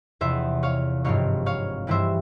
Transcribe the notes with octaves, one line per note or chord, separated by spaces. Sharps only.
E2 C3 F3 C5 E5
C#5 F5
G#1 G2 F3 C4 C#5 F5
C#5 F5
G2 E3 G3 C4 C5 E5